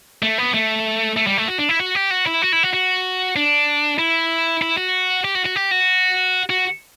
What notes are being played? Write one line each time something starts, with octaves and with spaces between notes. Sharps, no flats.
A3
B3
A3
A3
G3
A3
F#4
D4
E4
F#4
G4
F#4
E4
F#4
E4
F#4
F#4
D4
E4
E4
F#4
G4
F#4
F#4
G4
F#4
F#4